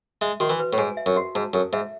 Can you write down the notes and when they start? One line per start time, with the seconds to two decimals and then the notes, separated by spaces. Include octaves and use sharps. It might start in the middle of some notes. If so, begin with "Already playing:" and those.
0.21 G#3 E5
0.40 D#3 F#4
0.50 E3
0.59 B4
0.73 A2
0.78 G#2 G#5
0.97 E5
1.06 F#2
1.16 F#4
1.35 G#2 A5
1.54 F#2 A4
1.73 G#2 E5